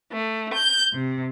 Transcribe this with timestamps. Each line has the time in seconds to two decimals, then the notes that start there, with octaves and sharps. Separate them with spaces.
0.13 A3
0.54 G6
0.93 C3